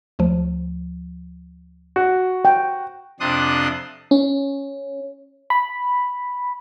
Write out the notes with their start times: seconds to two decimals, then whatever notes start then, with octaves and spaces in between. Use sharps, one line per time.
0.19 D2 F3
1.96 F#4
2.45 G5
3.20 F2 C3 D4 C6 D#6 F#6
4.11 C#4
5.50 B5